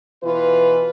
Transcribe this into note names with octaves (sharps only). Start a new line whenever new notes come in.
B2 E3 F4 B4